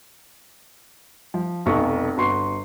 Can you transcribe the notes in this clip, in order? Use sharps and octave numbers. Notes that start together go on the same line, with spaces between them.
F3
F1 B1 C#6
G1 F#4 B4 C6 C#6 C7